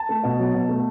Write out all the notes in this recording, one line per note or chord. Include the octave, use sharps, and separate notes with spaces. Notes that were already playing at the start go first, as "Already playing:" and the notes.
Already playing: A5
A3
B2
F#3
B2
A3